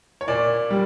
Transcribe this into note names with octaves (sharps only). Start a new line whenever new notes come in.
C#5
A#2 D5
G3